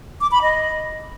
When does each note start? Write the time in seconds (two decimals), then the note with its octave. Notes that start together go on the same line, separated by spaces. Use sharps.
0.21 D6
0.31 B5
0.42 D#5